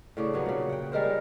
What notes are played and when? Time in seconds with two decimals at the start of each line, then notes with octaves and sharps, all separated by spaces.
0.17 A2 C#3 D4
0.33 G2 F#3 B3
0.46 A#2 C#3
0.69 F#5 G5
0.92 G3 G#3 A#4 C5
1.05 D#4